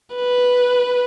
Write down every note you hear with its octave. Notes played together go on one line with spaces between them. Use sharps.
B4